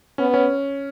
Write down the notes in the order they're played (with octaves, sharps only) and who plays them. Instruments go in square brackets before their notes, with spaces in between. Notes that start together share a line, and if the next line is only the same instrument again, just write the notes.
[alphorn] B3 [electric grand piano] C#4
[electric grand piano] C#4